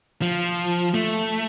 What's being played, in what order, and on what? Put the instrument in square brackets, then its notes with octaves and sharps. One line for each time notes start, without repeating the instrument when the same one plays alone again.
[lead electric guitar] F3
A3